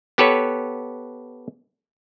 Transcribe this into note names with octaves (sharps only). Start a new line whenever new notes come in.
B3 G4 A4 B4 C#5